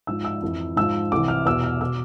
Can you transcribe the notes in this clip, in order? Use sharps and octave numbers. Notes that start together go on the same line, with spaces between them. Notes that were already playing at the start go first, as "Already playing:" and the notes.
G#2 F3 E6
E6
F2 E3
G#2 F3 E6
C2 C3 E3 D6
F6
E2 B2 E6
F6
B2 E6